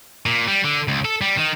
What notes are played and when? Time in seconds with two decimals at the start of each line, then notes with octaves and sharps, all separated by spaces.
0.26 A#2
0.48 G3
0.64 D3
0.88 C#2
1.05 A4
1.21 G3
1.37 D#3